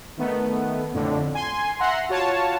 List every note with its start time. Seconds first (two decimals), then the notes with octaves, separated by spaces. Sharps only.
0.18 D#3 A3 B3
0.93 F2 A2 D3
1.35 G#5 C6
1.79 E5 F#5 A#5 C6
2.09 F4 F#4 C#5 A5